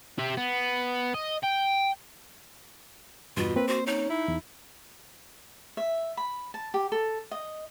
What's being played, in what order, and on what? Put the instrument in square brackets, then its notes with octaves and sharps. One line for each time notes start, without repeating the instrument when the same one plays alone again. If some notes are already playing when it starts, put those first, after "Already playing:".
[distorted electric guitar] G4 E5
B3
D#5
G5
[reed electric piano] E2 G2 [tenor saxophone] B2 [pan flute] F4
[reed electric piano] A#3 C4 [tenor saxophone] B4
[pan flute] F#4 [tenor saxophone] C5
[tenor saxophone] C#4 [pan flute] D#4
[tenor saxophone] E4
[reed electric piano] E2
[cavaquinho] E5
B5
A5
G4
A4
D#5